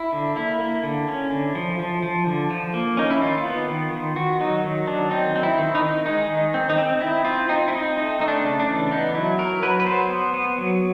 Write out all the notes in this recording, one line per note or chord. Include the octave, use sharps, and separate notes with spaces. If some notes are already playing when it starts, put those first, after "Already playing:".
Already playing: E4
D3
A#3 E4
A#3
D3
C#4
D3
F3
F3
F3
D3
F3
A#3
C#4 D#4
E4
D#3 F4
B3
D#3
D#3
D#3 F#4
F#3 D#4
D#3
F#3 D4
C4 D#4
C4
E4
D#3
D#4
D#3
G#3 D#4
D#3
C4
D#4
C4
C4 E4
C4 F4
C4 D#4
E4
C4 D#4
A3 D#4
A3 D#4
D4
C#3
D4
E3
B3 D#4
F#3 E4
F#3 A#4
F#3 B4
B4
B3 C5
B3
B3
F#3